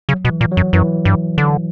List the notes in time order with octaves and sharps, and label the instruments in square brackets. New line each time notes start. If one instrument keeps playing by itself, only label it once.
[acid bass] C#3 [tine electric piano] F#3
[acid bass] B2
[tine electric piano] E3
[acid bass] A#2
[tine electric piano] F#3
[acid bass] F#2
[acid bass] F#2 [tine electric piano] E3
[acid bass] G2
D3